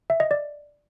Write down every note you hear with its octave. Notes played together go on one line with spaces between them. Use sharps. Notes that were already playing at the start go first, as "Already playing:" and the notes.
E5
D#5
D5